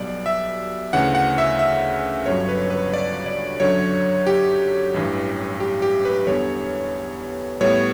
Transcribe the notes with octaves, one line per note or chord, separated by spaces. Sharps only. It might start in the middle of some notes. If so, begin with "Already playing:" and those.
Already playing: B1 B2 G3 D5
E5
D2 C#3 E3 F#5
F#5
E5
E5
G1 G2 D3 F#3 C#4 C#5
B4
B4
D5
D5
F#2 D3 F#3 C#5
G4
A1 G2 E3
G4
G4
B4
E2 D3 G3 B3 C#5
A2 G3 B3 C#5